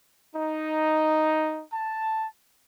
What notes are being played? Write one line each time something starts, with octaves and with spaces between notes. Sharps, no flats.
D#4
A5